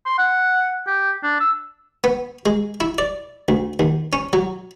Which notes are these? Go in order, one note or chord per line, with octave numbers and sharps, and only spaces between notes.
C6
F#5
G4
D4
E6
B3
G#3
E4
D5
D2
D#2
C#4
F#3